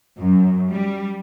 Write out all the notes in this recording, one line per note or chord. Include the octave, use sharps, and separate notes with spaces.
F#2
G3